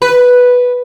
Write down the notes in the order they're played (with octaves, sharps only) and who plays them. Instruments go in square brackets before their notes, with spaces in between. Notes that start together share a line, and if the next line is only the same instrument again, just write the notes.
[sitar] B4